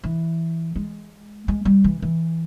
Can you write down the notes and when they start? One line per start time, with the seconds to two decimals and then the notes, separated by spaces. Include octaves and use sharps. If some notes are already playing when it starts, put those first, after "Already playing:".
0.04 E3
0.76 G#3
1.48 G#3
1.65 G3
1.84 E3
2.02 E3